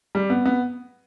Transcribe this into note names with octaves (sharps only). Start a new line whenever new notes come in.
G3
B3
B3